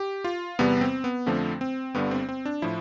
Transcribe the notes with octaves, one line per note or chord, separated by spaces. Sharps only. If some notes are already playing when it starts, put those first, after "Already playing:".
Already playing: G4
F4
E2 C3 G3 B3
C4
B3
F2 D3 F3 A3 C4
C4
G1 G2 D3 G3 B3
C4
C4
D4
A2 F3 E4